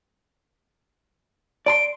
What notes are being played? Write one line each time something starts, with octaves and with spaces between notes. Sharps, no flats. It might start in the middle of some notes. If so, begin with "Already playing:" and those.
D5 A#5 C6 D7